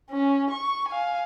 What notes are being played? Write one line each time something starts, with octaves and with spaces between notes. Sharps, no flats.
C#4
C#6
F5 G#5